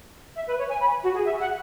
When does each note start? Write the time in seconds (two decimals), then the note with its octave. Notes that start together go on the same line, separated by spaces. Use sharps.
0.36 E5
0.47 B4
0.58 C#5
0.69 G#5
0.80 B5
1.04 F#4
1.14 G#4
1.25 E5
1.41 F#5